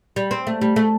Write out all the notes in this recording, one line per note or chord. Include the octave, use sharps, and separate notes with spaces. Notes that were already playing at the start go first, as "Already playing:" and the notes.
G3
C4
A3
G3
A3